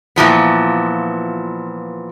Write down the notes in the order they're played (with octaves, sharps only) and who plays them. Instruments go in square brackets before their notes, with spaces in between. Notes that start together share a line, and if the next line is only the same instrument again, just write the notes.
[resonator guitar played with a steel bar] A#2 E3 F3 B3